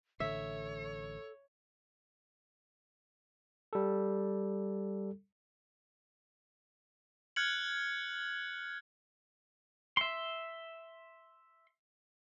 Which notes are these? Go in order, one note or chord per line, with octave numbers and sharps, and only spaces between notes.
A1 D3 A4 C#5 E5
G3 A4
F6 F#6 G#6 C#7 F#7
E5 C6